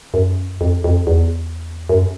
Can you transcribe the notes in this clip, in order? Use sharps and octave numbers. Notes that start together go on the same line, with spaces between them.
F#2
F2
F2
E2
F#2